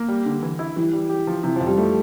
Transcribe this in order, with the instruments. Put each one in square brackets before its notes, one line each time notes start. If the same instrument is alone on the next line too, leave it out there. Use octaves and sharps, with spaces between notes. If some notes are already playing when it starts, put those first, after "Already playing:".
Already playing: [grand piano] A#3
G3
D3
E3
E4
[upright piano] E3 [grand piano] G3
[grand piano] G3
G4
F3
[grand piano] C3 [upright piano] E3
[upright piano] F3
[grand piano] F2
[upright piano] G3
[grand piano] G3 [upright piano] A3